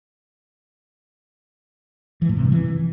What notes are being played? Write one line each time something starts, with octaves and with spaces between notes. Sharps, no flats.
E3
A2
C3
G2
E3